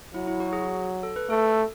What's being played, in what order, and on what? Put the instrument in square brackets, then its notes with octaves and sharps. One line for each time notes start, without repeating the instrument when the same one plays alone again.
[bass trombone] F#3 [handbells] E4
[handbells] E4
F#4
G#4
A4
B4
[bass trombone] A3 [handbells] A4